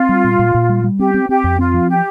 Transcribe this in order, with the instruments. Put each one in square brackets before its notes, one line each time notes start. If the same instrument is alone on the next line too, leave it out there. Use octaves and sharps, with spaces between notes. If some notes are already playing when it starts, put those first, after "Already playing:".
Already playing: [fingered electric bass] C4 [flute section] F4
[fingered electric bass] G3
A#2
A#2
A#2
G3
G3
[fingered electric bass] C4 [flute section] G4
[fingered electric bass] C4
[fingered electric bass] C4 [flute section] G4
[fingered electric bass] F2
[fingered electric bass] C4 [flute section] F4
[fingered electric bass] F3
[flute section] G4